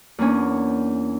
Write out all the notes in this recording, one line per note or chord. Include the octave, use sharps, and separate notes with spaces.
E2 A#3 C#4 D4